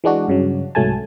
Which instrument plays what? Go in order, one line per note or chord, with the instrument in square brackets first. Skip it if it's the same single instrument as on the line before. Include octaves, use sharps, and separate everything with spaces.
[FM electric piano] E3 G#3 D4 F#4
G2 C#3 F#3
C2 G#2 F#3 A3 G#5 A5